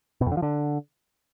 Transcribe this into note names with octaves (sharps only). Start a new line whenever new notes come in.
B2
F2
D3
F3
D3